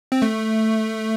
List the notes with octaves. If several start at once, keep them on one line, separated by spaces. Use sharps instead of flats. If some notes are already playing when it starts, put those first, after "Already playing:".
C4
A3